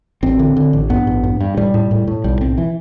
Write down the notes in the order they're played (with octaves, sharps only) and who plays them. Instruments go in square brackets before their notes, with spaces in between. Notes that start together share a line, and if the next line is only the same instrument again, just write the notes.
[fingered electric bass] A1 C4
D3
D3
A1
G2 B3
A1
G2
G2
A2 G3
A2
A2
A2
B1 G3
B1 C4
E3